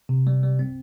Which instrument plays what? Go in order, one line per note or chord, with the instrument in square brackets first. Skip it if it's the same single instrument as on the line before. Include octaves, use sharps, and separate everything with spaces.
[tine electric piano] C3
G3
G3
C4